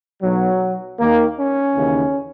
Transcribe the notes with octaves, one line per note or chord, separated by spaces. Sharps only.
B1 B2 F#3
D#2 D#3 A#3
C#4
D#2 C#3 E3